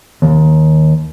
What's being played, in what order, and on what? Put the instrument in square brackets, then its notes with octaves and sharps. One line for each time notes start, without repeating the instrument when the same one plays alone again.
[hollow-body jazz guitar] D#2